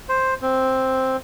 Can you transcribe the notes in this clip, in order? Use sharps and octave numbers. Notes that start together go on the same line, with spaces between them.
C5
C4